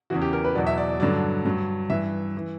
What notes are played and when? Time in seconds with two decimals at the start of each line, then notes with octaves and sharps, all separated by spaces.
0.10 E2 C#3 E3 F#4
0.21 G4
0.33 A#4
0.44 B4
0.55 E2 B2 F#3 D5
0.67 E5
0.78 D5
0.89 D5
1.00 G2 D3 F#3 D5
1.45 G2 F#3
1.90 G2 E3 E5
2.37 E3